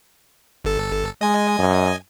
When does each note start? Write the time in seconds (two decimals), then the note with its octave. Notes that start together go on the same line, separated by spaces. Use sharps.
0.65 G1 A4
1.21 G#3 D#5 G#5
1.58 F#2